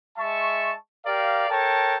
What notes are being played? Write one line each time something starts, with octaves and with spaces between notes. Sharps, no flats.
G#3 E5 A5 C#6
G4 A#4 D5 F5
A4 A#4 C#5 G5 A5